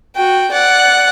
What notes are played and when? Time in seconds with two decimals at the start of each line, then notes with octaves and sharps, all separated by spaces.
0.16 F#4 G5
0.51 D5 F#5